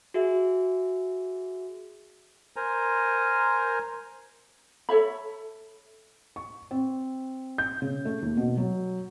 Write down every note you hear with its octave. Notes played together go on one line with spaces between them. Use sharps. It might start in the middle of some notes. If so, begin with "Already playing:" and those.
F#4 G#4 E5
A#4 C5 G#5 A#5
A4 C#5 E5 B5
C#6
C4
G6
C#3
A3
D#2
B2
F#3